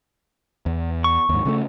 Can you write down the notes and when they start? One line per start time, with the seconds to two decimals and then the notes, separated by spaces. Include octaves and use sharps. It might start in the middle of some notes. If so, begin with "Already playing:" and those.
0.66 E2
1.04 C#6
1.29 D#2 G#2
1.45 C#3 G#3 A3